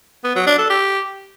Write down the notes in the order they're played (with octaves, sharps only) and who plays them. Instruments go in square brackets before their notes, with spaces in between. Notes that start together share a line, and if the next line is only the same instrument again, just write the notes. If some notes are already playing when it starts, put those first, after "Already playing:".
[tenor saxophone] B3
F#3
D4
A4
G4